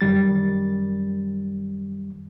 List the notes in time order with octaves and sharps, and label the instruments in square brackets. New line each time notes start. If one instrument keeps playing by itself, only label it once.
[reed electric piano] F#2 D#3 G3 A6